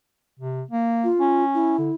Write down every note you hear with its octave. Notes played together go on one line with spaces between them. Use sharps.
C3
A#3
F4
C#4
E4
D3